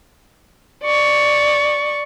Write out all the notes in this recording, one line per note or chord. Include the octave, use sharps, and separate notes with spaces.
D5 C#6